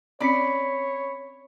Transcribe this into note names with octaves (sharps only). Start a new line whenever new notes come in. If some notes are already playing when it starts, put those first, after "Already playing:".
C4 C#4 C#5 D5 B5 B6 C#7